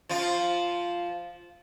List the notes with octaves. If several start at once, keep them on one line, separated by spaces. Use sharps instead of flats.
F3 F4